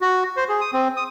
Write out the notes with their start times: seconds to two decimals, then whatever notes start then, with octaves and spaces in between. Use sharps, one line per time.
0.01 F#4
0.37 C5
0.49 G#4
0.61 D#6
0.73 C4
0.97 D#6